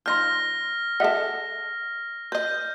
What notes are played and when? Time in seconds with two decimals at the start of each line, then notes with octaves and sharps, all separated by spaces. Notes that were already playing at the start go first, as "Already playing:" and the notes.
0.06 F3 D#4 C6 F6 G6 A#6
1.00 G#4 A4 D#5 E5 F#5
2.32 B4 D#5 G6